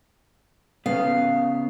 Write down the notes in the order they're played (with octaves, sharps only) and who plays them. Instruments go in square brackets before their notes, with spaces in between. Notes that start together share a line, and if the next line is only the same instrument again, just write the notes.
[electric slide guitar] C#3 B3 [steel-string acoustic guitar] F5